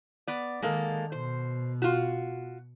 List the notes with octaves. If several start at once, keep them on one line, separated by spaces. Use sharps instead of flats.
B3 D5
D#3 G#3 A#3 A4
B2 C5
F4 F#4